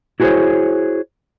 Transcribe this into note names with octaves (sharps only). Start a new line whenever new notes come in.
E4 F#4 G#4 A#4 C5 C#5